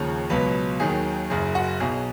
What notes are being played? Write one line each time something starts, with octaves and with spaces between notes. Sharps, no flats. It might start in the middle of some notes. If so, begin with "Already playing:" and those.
Already playing: D#2 C#3 F3 C#5
C#2 B2 F#3 B4
D#2 D#3 F#3 G#4
F#1 F#2 C#3 G#4
F#4
B1 B2 F#3 G#4